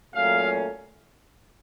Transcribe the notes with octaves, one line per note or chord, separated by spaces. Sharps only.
A#2 F#3 A3 C#4 F5